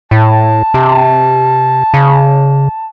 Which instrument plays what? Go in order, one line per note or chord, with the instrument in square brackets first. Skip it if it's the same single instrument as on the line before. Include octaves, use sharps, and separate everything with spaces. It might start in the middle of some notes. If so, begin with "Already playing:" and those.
[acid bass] A2 [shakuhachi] A5
[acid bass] C3
C#3